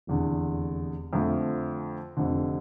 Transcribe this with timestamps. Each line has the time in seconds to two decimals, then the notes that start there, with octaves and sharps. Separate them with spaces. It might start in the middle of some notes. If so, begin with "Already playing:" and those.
0.07 F1 E2 D3
1.13 F2 D3 F3 A3
2.17 F1 F2 D3